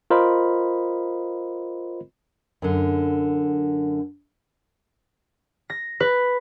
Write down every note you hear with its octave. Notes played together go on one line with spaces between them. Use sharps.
F4 A#4 C5 D#5 B5
F#2 D3
A#6
B4